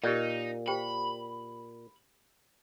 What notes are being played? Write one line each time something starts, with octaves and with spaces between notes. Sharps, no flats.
A#2 D#4 G4 A#4 D5
G4 C5 G5 B5